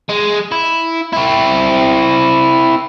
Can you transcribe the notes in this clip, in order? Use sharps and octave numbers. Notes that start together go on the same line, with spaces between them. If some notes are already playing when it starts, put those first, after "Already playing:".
G#3
E4
C4 E4